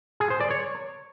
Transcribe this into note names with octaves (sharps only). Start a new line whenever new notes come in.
G#4
C5
D5
C#5